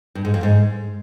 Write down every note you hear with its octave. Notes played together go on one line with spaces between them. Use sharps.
G2
G#2
F2
G#2